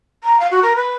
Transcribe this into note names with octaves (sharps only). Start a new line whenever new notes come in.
A#5
F5
F#4
A#4
B4